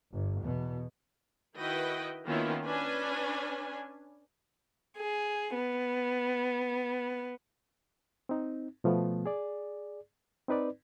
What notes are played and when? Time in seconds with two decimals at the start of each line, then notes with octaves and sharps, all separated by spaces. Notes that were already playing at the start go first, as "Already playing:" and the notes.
0.12 G1
0.42 E2 B2
1.57 D#3 E4 F#4 B4 D#5 G5
2.26 D#3 A#3 B3 C#4 E4 F4
2.65 C#4 D4 B4 G#5
4.97 G#4
5.55 B3
8.29 C4 D#4
8.84 B2 F3 A3 B3
9.26 G#4 D5
10.48 C4 D#4 B4 D5